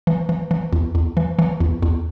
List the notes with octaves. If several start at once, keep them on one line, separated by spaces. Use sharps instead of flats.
E3
E3
E3
E2
E2
E3
E3
E2
E2